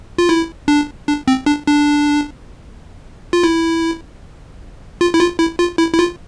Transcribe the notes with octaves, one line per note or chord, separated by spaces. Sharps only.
F4
E4
D4
D4
C4
D4
D4
F4
E4
F4
E4
F4
E4
F4
E4
E4
F4